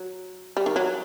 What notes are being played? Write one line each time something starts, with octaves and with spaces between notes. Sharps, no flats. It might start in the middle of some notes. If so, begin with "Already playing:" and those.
Already playing: F#3
G3
D#3
F#3